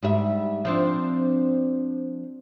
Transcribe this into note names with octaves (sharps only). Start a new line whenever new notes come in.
G#2 G3 E5
F3 C4 D4